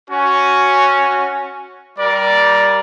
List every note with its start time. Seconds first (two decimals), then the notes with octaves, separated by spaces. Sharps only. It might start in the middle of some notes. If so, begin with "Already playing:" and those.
0.10 C#4 F#4
1.99 G3 A#4 D5